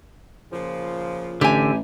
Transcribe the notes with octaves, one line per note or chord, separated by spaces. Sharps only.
A#2 C#3 F3
A1 D3 G4 G#5